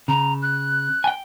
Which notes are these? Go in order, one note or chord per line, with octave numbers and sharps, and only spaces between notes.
C#3 A#5
F#6
G5 G#5